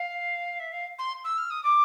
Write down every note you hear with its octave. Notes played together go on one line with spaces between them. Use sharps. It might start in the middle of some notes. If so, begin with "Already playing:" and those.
Already playing: F5
E5
F5
C6
E6
F6
D#6
D6